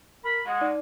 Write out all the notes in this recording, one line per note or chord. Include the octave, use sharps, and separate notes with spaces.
A#4 B5
G#3 F#5
D#4 D5